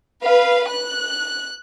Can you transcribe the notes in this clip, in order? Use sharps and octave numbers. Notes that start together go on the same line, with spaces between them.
B4 F5
F#6